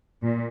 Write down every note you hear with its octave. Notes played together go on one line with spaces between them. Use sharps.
A#2